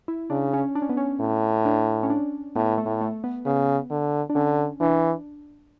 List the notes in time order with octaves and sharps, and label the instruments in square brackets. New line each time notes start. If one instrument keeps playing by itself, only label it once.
[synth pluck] E4
[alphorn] C#3 [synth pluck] D4
[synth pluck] C#4
D4
C#4
B3
C#4
[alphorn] A2
[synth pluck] D4
C#4
D4
[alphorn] A2 [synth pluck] B3
[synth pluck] A3
[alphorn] A2
[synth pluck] A3
B3
[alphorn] C#3 [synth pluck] B3
[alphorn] D3
[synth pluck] D4
[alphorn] D3 [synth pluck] C#4
[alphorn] E3 [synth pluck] D4